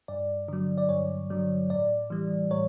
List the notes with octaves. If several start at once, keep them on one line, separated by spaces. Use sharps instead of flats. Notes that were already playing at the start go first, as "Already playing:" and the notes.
G2 D5
D3 F#3
D5
G2 C#5
D3 F#3
A2 D5
E3 G3
A2 C#5